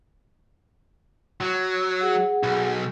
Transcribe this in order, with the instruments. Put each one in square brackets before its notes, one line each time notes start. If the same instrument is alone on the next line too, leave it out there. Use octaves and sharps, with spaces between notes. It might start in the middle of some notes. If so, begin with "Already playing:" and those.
[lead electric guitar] F#3
[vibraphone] G#4 F#5
[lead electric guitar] B1